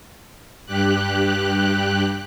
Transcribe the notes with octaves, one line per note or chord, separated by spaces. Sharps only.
G2 G4 F#6